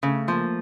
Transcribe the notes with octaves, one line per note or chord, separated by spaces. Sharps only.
C#3 A3
F3 A#3